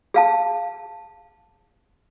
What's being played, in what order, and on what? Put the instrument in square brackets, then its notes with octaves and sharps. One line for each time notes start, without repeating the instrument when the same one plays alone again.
[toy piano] G#4 F5 A5